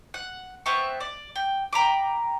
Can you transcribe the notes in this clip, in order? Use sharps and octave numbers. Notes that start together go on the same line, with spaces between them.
F#5
B3 C4 E5 C#6
D5
G5
G5 A#5 B5 D6